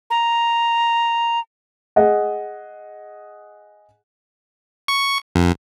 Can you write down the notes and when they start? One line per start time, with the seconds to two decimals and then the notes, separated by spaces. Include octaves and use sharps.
0.10 A#5
1.96 G#4 D#5 F#5
4.88 C#6
5.35 F2